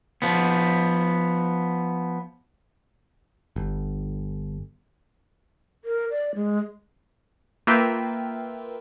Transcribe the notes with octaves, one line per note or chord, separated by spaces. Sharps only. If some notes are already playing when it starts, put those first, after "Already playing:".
F3 B3
G1
A#4
D5
G#3
A#3 F4 B4 E5 G5